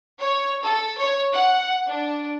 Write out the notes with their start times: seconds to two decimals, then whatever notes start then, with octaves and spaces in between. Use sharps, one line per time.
0.19 C#5
0.63 A4
0.98 C#5
1.33 F#5
1.87 D4